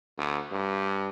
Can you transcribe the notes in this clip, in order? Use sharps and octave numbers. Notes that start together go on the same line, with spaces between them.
D2
G2